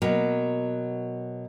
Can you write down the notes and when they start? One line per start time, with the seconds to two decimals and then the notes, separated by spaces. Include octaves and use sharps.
0.02 B2 F#3 A#3